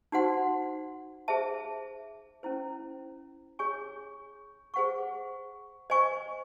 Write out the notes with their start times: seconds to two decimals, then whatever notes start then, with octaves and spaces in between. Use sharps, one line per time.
0.12 D#4 F#4 C5 F#5 C6
1.28 G#4 C5 E5 A5
2.43 C#4 E4 C5
3.59 G#4 C#5 G#5 C#6
4.74 G#4 C5 F#5 C#6
5.90 C5 D#5 G#5 C#6